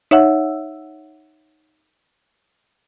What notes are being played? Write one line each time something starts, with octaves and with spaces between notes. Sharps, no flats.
D#4 C#5 E5 F#5 E6